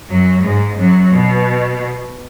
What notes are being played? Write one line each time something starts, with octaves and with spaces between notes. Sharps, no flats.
F#2 F#3
G#2 G#3
F#2 F#3
B2